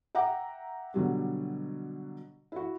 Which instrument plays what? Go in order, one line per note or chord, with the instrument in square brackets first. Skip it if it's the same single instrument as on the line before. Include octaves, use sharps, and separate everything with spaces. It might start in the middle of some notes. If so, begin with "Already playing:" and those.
[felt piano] E5 F#5 G5 A#5 D6
B2 D3 F#3 G3
E4 F#4